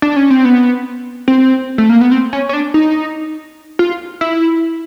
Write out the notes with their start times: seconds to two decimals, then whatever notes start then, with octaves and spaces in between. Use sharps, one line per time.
0.02 D4
0.16 C#4
0.30 C4
0.45 B3
1.28 C4
1.78 A3
1.90 A#3
2.01 B3
2.12 C4
2.33 C#4
2.49 C#4
2.53 D4
2.74 D#4
3.79 F4
4.21 E4